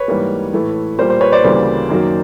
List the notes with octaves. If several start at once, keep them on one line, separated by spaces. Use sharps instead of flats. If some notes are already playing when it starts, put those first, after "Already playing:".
Already playing: B4 C#5
G#2 E3 G3 A#3
A2 E3 A3
A#2 G3 A#3 C5
C5
B4 C#5
C5 D5
D2 C#3 E3 G3 A#3
F#2 D#3 F#3 A#3